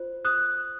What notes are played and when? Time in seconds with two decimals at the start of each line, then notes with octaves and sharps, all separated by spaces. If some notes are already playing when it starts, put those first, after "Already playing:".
Already playing: F4 C5
0.25 D#6 F#6